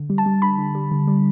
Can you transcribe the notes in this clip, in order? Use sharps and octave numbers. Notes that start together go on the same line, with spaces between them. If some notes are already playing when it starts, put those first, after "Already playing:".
Already playing: D3
G3
A5
G3
D3 B5
D3
G3
D3
G3